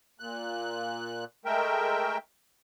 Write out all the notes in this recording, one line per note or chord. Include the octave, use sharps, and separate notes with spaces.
A#2 F#6
G#3 A3 A#4 E5 G5